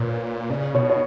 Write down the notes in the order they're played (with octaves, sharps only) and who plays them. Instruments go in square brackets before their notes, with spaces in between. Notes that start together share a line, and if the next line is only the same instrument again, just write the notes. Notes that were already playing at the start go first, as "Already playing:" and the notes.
Already playing: [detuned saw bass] A#2 [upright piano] B4 C#5
[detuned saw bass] C#3 [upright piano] D5
[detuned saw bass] B2 [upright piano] C#5
[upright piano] C#5